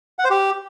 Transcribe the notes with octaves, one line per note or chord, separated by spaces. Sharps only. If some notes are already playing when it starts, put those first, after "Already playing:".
F#5
C5
G4